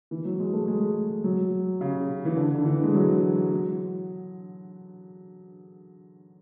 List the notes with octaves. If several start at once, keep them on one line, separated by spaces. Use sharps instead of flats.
E3
F#3
G#3
A3
G#3
F#3
C#3
E3
D3
D3
E3
G#3
F#3
F#3